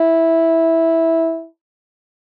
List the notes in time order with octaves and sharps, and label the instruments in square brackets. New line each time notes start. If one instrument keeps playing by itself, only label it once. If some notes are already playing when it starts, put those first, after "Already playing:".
Already playing: [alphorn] E4